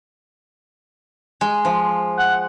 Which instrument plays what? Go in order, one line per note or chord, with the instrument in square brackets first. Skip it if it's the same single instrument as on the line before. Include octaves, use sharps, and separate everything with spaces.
[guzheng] G#3
F3
[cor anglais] F#5